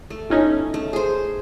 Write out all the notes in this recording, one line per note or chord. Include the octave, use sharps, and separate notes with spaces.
A3
G1 C#4 D#4
A3
G#4 C5